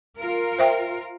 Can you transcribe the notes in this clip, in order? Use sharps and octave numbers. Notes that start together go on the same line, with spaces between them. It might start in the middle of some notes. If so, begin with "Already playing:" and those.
F4 A#4
C5 E5 G5